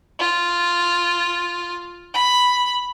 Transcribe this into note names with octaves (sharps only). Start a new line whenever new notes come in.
F4
B5